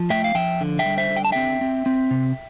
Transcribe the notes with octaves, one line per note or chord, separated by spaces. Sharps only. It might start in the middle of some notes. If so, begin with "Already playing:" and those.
Already playing: F3
A3 E5 G5
F5
F3 E5 G5
D3
E5 G5
G3
C5 E5
D3
G5
A5
C4 E5 G5
C4
C4
C3